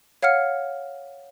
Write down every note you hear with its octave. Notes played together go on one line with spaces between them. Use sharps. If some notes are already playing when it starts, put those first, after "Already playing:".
C#5 F5 F#5 F6 C#7